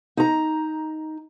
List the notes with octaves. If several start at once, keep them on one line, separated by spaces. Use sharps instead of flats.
D#4 A#5